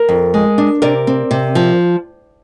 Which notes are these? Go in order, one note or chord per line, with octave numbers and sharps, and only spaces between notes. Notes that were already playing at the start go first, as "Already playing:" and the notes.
Already playing: A#4
F2
G#3
D4
C3 A#4 D5
C4
C3
F3